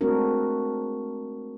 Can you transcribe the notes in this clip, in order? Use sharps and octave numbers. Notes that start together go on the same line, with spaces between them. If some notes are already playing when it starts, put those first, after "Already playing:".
G#3 A3 C4 D4 F#4 A#4